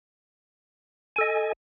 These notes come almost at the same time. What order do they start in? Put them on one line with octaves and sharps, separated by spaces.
G#5 A4 D#5